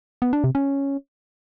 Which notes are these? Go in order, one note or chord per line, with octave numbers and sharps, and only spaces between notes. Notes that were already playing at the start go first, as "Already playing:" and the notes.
B3
D4
C3
C#4